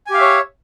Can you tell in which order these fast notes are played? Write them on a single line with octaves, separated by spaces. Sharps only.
G#5 G4 F5 E5 C#5